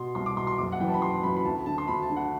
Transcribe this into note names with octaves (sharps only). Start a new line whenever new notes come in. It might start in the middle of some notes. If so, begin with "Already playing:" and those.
Already playing: B2 C6
C2 C6
D6
B2 C6
C6
F#1 D6
F#5
F#2 E3 G5
A5
B5
F#1 C6
F#2 E3 B5
B5
D2 A5
D3 A5
C6
D2 B5
A5
D3
F#5